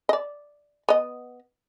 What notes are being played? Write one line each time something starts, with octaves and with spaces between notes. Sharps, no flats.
D5 D#5
B3 D#5